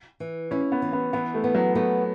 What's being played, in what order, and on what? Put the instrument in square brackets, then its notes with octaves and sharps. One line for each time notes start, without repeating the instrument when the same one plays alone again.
[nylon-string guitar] E3
[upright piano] C#4 [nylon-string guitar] E4
[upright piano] B3
[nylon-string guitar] E3
[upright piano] B3
[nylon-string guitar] E3 [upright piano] B3
[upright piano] A3
[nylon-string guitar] B3
[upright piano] F#3
[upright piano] A3 [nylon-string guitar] B3